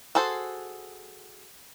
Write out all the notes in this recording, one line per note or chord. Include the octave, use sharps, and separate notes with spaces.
F#4 G#4 A4 C5